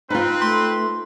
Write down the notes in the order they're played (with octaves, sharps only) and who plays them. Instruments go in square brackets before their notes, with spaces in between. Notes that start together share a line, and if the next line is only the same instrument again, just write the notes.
[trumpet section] C4 B4 [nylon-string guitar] D#4 F4
[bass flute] A3 [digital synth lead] C6